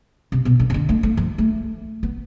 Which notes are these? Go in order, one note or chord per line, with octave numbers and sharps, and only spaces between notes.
C3
B2
D3
C3
D3
A3
A3
F3
A3
B3